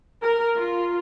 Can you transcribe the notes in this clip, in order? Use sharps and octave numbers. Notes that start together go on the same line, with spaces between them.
A#4
F4